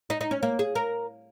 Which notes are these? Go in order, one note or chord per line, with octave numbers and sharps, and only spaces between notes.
D#4
D#4
C#4
A#3
G#4
A#4